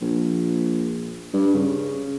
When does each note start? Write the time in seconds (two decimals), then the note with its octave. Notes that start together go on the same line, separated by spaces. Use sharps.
0.01 A#1
1.34 G2
1.54 C#3